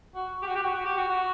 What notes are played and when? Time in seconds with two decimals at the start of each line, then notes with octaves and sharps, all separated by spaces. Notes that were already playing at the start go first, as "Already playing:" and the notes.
0.15 F#4
0.42 G4
0.46 F#4
0.55 G4
0.62 F#4
0.74 F#4
0.85 G4
0.97 F#4
1.09 F#4